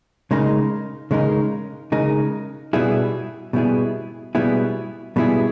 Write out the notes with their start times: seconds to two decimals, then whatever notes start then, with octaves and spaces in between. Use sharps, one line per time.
0.31 C#3 G#3 D#4 A#4
1.11 C#3 G#3 D#4 A#4
1.92 C#3 G#3 D#4 A#4
2.73 B2 G3 B3 E4 G#4
3.53 B2 G3 B3 E4 G#4
4.35 B2 G3 B3 E4 G#4
5.16 B2 G3 B3 E4 G#4